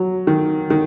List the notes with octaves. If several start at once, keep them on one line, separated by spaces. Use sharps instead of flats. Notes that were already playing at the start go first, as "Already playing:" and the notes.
Already playing: F#3
D#3
D#3